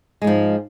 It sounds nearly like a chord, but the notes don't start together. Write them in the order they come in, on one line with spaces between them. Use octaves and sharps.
G#3 G#2 F3